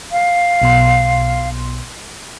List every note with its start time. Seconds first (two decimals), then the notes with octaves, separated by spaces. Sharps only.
0.12 F5
0.62 B1 B2 C6